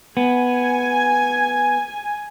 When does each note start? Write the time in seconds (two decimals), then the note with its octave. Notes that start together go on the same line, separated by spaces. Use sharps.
0.17 B3 G#5